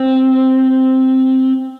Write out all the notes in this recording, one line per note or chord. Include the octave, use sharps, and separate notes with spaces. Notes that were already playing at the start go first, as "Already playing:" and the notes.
Already playing: C4